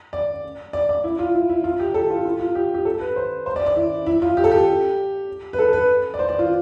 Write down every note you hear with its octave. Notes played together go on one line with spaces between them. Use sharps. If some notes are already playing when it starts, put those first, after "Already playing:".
D5
D5
D5
E4
F4
E4
E4
F4
G4
A4
F4
F4
F4
G4
G4
A4
B4
C5
C5
D5
D5
E4
E4
F4
G4
A4
G4
B4
A4
B4
D5
C5
D5
F4